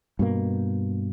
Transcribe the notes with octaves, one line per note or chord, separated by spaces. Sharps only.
G2 B2 A#3